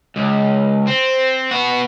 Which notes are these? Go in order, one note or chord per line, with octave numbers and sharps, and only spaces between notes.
C#2
C4
B3 F#4